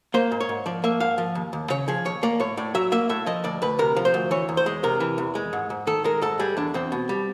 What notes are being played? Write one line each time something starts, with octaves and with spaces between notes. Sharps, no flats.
A#3 C5
G#2
C#5
G#2
F3 D5
A#3 E5
G#2 F5
F3
D#2
D#2
C#3 C#5
F3 G#4
D#2 C#5
A#3 D5
A2 C#5
A2 D5
F#3 E5
A#3 E5
A2 E5
F3 D#5
D2 D5
D2 B4
C3 A#4
F3
C5
D2
E3 C#5
E2
C5
G#3
C3 A#4
E3
E2
G#3
G#2
G#2
D#3 A4
G#3 A#4
G#2 A4
G3 G#4
E2 D4
E2 C4
B2
G3